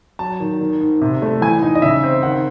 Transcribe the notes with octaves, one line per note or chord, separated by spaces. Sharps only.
F#3 A5
D#3
D#3
G#2
C3
A3
E3 G#5
D#4
D#5
C#3 E5
C4
D#3 F#5